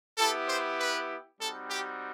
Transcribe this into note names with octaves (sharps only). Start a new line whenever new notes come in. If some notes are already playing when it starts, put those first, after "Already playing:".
B3 E4 G4 A4
C5
B4
G3 C4 D#4 F#4 A4
G4